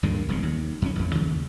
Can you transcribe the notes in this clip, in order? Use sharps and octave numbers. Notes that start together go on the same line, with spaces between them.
D2 G2 A#2 C#3
E1 C2 C#3
D#2
F2 C#4
A1 F2
D#2 C#3